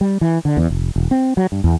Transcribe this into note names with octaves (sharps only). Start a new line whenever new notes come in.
G3
E3
D3
E2
F1
E1
C4
F#3
G2
E2